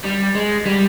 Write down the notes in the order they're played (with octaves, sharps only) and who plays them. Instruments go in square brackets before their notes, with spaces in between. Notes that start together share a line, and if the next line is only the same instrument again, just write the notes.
[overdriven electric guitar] G3
G#3
G3